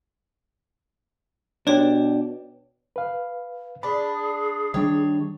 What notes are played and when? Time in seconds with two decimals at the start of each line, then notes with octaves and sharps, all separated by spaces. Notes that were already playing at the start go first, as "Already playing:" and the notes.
1.67 B2 D4 G4 B4 C#5
2.96 B4 F5
3.83 D4 G#4 B5
4.74 D#3 G3 D4 C#5